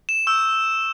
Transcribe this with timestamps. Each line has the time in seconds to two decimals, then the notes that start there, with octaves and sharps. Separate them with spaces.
0.09 E7
0.27 C#6 E6 G6